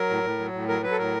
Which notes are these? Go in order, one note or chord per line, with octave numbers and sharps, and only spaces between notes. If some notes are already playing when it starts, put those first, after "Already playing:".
Already playing: F#3 A#4
A2
A2
F#3
A2
F#3 A#4
F#3 B4
A4
A2 A#4